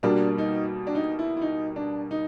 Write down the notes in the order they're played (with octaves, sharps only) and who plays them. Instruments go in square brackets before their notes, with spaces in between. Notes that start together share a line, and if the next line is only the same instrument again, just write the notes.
[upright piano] B2 G3 A#3 [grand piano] D4
[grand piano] D#4
D4
D#4
E4
E4
D#4
D4
D#4